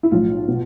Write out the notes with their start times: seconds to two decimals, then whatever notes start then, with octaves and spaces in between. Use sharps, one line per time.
0.03 E4
0.11 B1 A2 F3 F4
0.48 B2